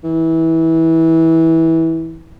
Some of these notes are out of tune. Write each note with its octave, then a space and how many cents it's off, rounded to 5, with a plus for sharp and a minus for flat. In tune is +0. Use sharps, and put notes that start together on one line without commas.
E3 -20